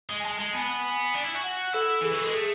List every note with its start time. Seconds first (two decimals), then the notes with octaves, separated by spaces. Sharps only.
0.09 G#3
0.20 G#5
0.24 G#3 A5
0.39 G#3
0.53 B3 G#5
1.14 D4
1.23 E4
1.34 F#4
1.44 F#5
1.73 E4 A4
2.01 E3 G#4
2.11 F#3 B4
2.18 A4
2.23 G#3
2.33 A3 G#4